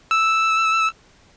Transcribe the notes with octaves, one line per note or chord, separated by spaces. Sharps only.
E6